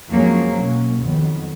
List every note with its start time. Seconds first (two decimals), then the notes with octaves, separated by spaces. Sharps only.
0.10 F2 F3 F#3 G#3 A#3 C#4
0.55 B2 F#3 A#3 C#4
1.00 F2 D#3 F#3 B3